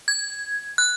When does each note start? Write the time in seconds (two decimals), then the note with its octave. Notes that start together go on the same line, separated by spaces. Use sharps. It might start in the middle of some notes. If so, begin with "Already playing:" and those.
0.08 G#6
0.78 F#6